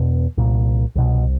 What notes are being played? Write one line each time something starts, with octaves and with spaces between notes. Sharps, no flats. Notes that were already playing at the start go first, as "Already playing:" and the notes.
Already playing: E2 B2
C2 A#2
C2 B2